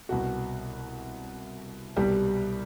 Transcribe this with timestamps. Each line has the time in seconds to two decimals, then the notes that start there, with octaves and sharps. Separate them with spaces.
0.09 C2 B2 F#4
1.96 C2 B2 G3 G4